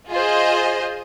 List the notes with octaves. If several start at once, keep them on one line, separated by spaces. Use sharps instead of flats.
F4 G#4 C5 D#5